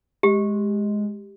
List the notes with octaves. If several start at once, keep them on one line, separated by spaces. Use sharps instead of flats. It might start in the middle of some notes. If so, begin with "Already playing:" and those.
G#3 G4